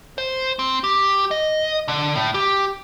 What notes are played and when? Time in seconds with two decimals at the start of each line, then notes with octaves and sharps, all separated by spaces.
0.18 C5
0.59 C4
0.84 G4
1.31 D#5
1.88 D3
2.16 A2
2.34 G4